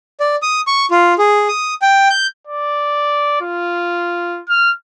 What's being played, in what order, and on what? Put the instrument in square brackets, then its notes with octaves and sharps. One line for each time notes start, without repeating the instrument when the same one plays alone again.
[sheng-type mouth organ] D5
D#6
C#6
F4
G#4
D#6
G5
G6
[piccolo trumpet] D5
F4
F6